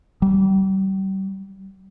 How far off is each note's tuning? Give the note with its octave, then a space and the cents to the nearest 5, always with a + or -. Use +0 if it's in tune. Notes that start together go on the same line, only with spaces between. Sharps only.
G3 -35